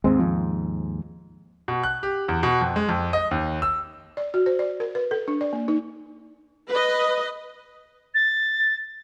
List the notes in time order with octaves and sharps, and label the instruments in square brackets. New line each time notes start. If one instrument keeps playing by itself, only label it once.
[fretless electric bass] D#2 G#2 [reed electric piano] G#3 C4
[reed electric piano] F3
[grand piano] B2
F#6
G4
E2
B2
F2
G#3
F2
D#5
D#2
E6
[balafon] D5
F#4
C5
D5
A#4
B4
A4
D4
D5
A#3
D#4
[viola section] B4 D#5
[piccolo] A6